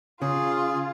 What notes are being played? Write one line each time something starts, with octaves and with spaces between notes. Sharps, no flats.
C#3 F4 G#4